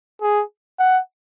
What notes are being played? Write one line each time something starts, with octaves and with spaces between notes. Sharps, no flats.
G#4
F#5